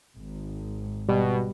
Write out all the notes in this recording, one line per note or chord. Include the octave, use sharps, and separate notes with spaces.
G#1
B2 G3